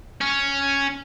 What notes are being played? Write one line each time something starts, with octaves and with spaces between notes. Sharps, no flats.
C#4